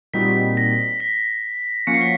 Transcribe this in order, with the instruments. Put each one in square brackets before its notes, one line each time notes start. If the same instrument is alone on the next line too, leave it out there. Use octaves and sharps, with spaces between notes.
[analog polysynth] A#2 G3 C4 D#4 F#4 [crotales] B6
[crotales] A#6
B6
[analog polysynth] F3 A#3 C#4 F#4 [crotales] C#7
[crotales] C7
B6